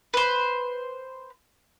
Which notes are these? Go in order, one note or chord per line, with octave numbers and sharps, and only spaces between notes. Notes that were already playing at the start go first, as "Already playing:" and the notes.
B4 C5